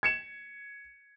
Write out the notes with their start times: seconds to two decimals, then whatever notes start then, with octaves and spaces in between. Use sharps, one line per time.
0.03 G#6 C#7 E7